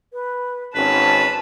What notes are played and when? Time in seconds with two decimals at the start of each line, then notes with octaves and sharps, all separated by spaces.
0.13 B4
0.75 G#1 C#4 B4 A5